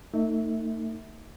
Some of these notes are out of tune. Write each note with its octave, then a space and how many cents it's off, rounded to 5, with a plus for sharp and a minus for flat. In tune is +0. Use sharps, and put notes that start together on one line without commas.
A3 +40 D#4 +0 E5 -15